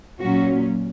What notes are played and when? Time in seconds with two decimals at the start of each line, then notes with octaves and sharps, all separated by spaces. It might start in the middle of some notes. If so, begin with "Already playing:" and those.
0.20 A#2 F#3 C#4 F#4